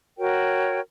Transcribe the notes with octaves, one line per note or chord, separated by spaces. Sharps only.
F#4 A#4 C#5 G5